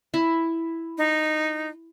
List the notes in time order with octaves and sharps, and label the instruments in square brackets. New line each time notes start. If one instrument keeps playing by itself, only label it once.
[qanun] E4
[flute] D#4